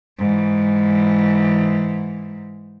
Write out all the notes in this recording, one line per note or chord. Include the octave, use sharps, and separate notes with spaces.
G#2 E3